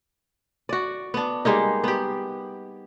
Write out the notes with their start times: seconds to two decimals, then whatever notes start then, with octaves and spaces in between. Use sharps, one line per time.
0.69 F#4 D5
1.14 B3 D4
1.45 G3 G#3 A#3 D#4
1.84 B3 G4